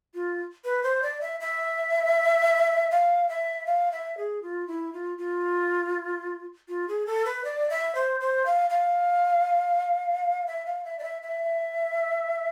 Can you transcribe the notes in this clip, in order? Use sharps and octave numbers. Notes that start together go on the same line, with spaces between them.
F4
B4
C5
D5
E5
E5
F5
E5
F5
E5
G#4
F4
E4
F4
F4
F4
G#4
A4
B4
D5
E5
C5
C5
F5
F5
E5
F5
E5
D5
E5
E5